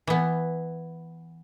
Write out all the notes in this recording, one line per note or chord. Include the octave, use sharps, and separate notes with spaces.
E3 B3